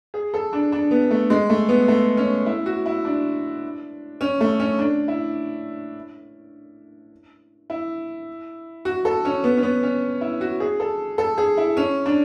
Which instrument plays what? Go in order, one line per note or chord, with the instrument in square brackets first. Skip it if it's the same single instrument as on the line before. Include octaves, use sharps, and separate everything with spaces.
[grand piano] G#4
A4
D4
D4
B3
A3
G#3
A3
B3
A3
C#4
E4
F#4
E4
D4
C#4
A3
C#4
D4
E4
E4
F#4
A4
C#4
B3
C#4
B3
C#4
E4
F#4
G#4
A4
A4
G#4
E4
C#4
D4